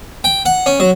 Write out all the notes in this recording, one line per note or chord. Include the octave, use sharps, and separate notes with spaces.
G5
F#5
C#4
F#3